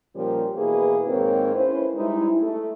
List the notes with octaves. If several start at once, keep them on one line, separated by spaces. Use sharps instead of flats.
A#2 F3 G3 C#4 G4 A#4
B2 E3 A#3 G#4 B4
G#2 D#3 A#3 C4 A#4 C#5
C#4 E4 B4 C5
G3 G#3 D#4 E4
A3